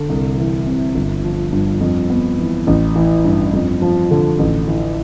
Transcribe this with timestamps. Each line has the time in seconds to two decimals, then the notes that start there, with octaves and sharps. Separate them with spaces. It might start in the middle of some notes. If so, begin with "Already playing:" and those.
Already playing: D3
0.09 C2
0.37 E3
0.66 C3
0.95 G1
1.24 F3
1.52 G2
1.81 F2
2.10 B3
2.38 E3
2.67 A1
2.96 E3
3.24 G2
3.54 F2
3.82 F3
4.11 D3
4.39 A1
4.68 E3